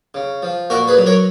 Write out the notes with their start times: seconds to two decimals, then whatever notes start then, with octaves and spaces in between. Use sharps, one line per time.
0.14 C#3
0.43 F3
0.70 A#2 F#4 A#4
0.88 G#4 B4
0.97 F#3
1.06 A#4 C#5